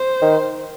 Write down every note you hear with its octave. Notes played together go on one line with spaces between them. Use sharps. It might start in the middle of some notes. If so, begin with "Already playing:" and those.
Already playing: C5
D#3